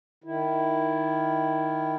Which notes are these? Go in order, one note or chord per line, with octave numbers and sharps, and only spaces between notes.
D#3 E4